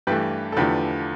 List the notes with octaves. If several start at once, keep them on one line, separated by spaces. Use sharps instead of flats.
G2 E3 A3 G4 B4
A4
E2 D3 F3 A3 G4 B4